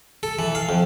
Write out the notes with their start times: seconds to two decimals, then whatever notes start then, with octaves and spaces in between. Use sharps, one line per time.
0.23 A4
0.39 E3
0.55 F5
0.69 F2